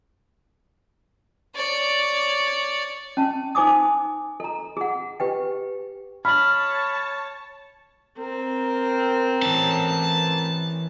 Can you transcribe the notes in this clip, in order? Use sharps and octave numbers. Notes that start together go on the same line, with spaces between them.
C#5 D5
C#4 A5
D#4 C5 G#5 D6 D#6
A4 A#5
G#4 F#5
G4 B4 G5
C#5 A5 B5 F6 F#7
C4 A#4
E3 C#4 A5